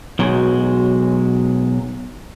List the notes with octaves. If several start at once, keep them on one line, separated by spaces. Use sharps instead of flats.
B1 F#3 G#3